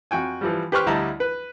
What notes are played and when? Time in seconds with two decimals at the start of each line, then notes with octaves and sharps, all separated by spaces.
0.11 F2 F#4 G5 G#5
0.41 E3 F3 G3
0.72 G4 B4 C5 G5 C#6 F6
0.87 D2 G3 E4 D#5 A5 A#5
1.20 B4